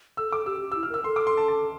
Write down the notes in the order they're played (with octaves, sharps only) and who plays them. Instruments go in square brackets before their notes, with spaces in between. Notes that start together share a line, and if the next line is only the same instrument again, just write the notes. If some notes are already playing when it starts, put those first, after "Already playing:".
[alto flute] A4 [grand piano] E6
[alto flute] A4 [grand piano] D6
[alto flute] G4 [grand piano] E6
[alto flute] G4
[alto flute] E4 [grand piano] E6
[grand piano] F6
[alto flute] A#4 [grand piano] E6
[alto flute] A4 [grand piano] C6
[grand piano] D6
C6
A5
A5